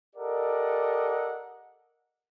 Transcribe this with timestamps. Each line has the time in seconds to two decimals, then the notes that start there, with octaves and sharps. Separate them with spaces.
0.16 G4 A4 A#4 D5 D#5 F#5